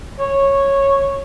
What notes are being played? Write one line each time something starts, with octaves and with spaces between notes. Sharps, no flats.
C#5